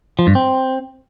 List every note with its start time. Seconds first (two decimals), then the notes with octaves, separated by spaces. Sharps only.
0.19 F3
0.27 G2
0.35 C4